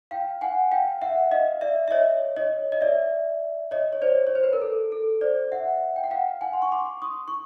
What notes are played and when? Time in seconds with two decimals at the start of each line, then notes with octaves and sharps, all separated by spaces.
0.11 F5 G5
0.41 F#5 G#5
0.72 F5 G5
1.02 E5 F#5
1.31 D#5 F5
1.61 D5 E5
1.88 E5
1.91 C#5 D#5
2.36 C#5 D#5
2.72 D#5
2.81 D5 E5
3.71 C#5 D#5
3.93 C#5
4.02 C5 D5
4.27 C#5
4.35 C5
4.44 B4
4.53 A#4
4.61 A4
4.92 A4
5.21 C5 D5
5.52 E5 F#5
5.96 G5
6.04 F#5
6.10 F5 G5
6.41 F#5 G#5
6.53 C6
6.62 C#6
6.72 C6 D6
7.02 C#6 D#6
7.28 C#6